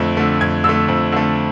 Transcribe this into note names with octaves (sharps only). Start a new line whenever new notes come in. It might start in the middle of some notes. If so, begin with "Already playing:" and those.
Already playing: F2 D3 A3
D3 A3
F2 G#6
D3 A3 E6
F2
D3 A3